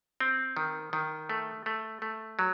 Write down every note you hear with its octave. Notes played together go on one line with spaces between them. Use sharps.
C4
D#3
D#3
A3
A3
A3
F#3